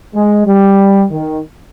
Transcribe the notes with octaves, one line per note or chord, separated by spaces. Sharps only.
G#3
G3
D#3